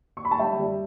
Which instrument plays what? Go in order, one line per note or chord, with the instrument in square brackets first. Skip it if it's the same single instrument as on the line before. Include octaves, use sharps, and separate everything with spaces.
[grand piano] C#6
B5
A5
G3 E5 G5
G3